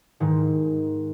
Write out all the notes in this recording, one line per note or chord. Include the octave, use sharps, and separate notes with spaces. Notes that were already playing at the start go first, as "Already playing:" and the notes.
G#2 D#3